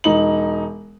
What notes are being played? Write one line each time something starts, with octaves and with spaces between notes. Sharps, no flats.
E1 D#4 F#7